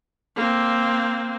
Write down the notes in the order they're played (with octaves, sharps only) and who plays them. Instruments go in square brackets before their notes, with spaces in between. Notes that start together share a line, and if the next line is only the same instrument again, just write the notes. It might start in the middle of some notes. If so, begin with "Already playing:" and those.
[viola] A#3 C4